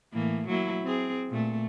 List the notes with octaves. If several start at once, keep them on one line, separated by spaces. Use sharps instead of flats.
A2 E3 A#3
F#3 A#3 E4
C4 G#4
A#2 A3